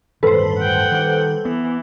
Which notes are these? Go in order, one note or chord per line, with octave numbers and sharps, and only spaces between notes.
D1 G2 D#3 A4 B4 C5
F#5 G5
D#3 G3
E3 B3